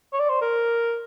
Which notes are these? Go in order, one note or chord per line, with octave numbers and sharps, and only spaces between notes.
C#5
D5
C5
A#4